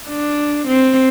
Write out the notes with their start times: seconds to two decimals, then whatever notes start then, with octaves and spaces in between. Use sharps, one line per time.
0.08 D4
0.68 C4